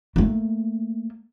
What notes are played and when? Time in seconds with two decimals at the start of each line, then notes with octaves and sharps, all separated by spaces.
0.16 A3 A#3